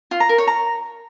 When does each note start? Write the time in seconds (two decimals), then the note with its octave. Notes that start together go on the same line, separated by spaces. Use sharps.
0.11 F4
0.20 A#5
0.29 A#4
0.38 C#5
0.47 A#5